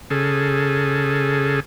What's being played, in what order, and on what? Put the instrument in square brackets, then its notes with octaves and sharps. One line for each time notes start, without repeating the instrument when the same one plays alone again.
[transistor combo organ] C#3 G#4 A4